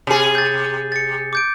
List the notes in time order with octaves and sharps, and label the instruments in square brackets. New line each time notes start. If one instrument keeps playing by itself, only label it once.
[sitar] C3 G#4
[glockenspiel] G6 A6
A6 C#7
D6 G6 D7